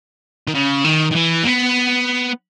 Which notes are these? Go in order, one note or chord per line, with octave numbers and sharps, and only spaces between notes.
D#3
C#3
D#3
D#3
E3
A#3
B3